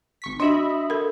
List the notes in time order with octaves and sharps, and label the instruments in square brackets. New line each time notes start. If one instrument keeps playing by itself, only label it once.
[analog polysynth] G#1 C#6 B6
[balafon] D4 F#4 [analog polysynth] D#5 E5 B5
[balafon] A4 A#4